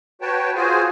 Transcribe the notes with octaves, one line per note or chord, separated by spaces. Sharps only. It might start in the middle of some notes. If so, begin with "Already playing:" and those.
F#4 B4 C#5 G5 A5
F4 F#4 G#4 C5 G#5